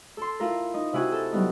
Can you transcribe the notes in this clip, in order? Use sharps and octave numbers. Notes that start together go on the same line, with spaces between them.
A4 C6
E4 F4 A#4
D#4
C3 E4 F#4 G#5
A4
F#3 G3 B3 D#4